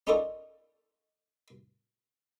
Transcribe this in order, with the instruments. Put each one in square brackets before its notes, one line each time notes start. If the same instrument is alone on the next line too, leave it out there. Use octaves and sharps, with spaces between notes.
[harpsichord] C#4 D#4 F4 A4 A#4 D5